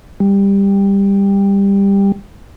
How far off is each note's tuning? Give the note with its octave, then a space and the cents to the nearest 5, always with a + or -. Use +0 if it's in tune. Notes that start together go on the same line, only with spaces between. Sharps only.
G3 +15